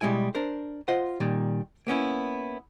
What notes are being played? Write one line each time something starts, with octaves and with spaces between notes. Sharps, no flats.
B2 G3 G#3 E4 G#5
D4 A#4 C5
F4 C5 D#5 F#5
A#2 D#3 G3
A#3 B3 C#4 E4